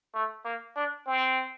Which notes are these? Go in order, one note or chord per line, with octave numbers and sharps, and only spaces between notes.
A3
A#3
D4
C4